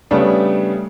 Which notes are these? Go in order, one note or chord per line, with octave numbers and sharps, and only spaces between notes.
C#3 G3 A3 B3 D4